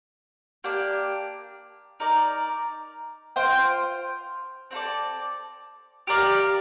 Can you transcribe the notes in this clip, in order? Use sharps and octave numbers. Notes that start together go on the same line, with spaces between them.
A#3 D4 G4
D#4 A#4 D5
F4 C5 G5
C4 F4 A4 D5
G4 A#4 D5 F5